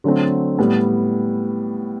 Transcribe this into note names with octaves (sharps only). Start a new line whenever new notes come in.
D3 F#3 A3 C4
A2 G3 B3